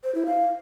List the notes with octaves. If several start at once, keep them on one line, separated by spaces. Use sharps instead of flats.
C5
E4
F5